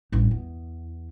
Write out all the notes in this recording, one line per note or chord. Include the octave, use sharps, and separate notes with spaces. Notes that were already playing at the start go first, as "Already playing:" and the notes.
A1 G2
E2